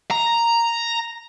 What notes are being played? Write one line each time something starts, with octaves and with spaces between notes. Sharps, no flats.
A#5